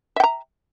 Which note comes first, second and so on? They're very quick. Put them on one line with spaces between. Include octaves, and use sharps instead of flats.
E5 G5 A#5